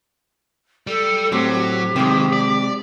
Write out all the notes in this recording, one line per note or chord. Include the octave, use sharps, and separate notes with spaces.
G3 A4
A2 F#3 C4 G4
G4
C3 D#3 G#3
D5